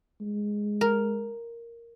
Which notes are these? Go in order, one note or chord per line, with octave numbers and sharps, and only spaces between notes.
G#3
A#4